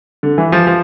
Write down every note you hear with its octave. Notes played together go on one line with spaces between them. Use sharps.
D3
E3
F3
F3